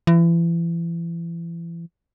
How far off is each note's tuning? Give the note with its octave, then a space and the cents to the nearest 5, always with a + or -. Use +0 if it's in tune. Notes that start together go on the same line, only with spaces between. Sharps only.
E3 +35